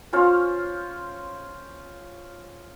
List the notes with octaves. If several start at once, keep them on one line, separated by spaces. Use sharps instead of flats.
C#4 F4 C5 F5